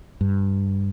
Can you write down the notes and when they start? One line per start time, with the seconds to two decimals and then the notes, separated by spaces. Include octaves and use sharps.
0.21 G2